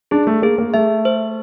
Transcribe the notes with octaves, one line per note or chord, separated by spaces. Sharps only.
D4 G#4
A3
A#3 G#4
A#3
A3 E5
C5